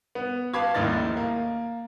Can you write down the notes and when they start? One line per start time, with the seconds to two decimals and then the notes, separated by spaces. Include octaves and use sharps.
0.15 B3
0.54 B4 F5 A5 B5 D6 G#6
0.75 A#1 D#2 A2 D#4 A6
1.17 A#3